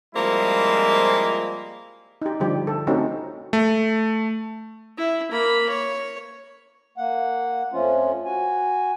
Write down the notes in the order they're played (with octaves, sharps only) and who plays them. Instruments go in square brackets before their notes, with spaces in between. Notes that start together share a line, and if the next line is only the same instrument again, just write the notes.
[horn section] F3 G3 G#3 A#3 C4 E4
[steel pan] D#4 G4
D3 F3 G3 G4
A4
A3 C4 C#4 D#4 F#4 G4
[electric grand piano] A3
[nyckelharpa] E4
A#3 B5
C#5
[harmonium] A#3 F#5
F2 F3 A3 C#4 F4
F#4 G#5